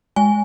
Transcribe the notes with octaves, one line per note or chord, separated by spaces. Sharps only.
G#3 G#5